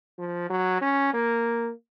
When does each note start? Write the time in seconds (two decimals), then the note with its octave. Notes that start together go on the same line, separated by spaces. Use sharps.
0.19 F3
0.50 F#3
0.82 C#4
1.14 A#3